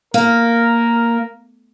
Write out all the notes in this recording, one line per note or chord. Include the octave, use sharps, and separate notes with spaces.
A#3 A#4